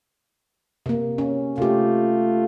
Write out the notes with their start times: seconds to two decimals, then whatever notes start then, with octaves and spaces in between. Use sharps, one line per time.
0.86 C3 A#3
1.18 C#4
1.58 C3 A3 F4 G4